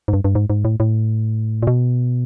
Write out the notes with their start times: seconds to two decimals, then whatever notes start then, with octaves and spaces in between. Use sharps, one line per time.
0.08 G#2
0.13 G2
0.25 G2
0.35 G#2
0.50 G#2
0.65 A2
0.80 A2
1.63 A#2
1.67 B2